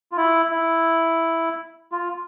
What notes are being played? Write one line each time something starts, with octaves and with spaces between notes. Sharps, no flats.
F4
E4
E4
F4